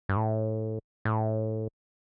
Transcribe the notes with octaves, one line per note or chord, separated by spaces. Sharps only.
G2
A2
A2